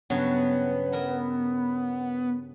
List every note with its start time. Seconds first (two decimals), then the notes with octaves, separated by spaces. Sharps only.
0.10 G2 C#3 F#3 B3
0.92 E4 A#4 D#5